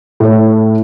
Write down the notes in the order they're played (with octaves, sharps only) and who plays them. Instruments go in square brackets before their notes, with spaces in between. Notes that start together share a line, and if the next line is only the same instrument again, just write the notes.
[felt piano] A2 C#5